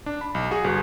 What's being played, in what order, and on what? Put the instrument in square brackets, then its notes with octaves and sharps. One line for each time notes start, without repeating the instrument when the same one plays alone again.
[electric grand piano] D4
B5
B1
F#4 G#4
G1 G#4